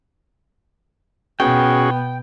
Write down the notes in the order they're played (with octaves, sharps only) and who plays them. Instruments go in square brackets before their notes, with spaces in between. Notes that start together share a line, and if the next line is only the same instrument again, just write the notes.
[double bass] B2 B3 [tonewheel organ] C#4 F#4 G#4 [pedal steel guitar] G5